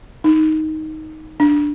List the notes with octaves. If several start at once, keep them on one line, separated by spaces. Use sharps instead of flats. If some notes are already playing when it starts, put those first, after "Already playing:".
D#4
D4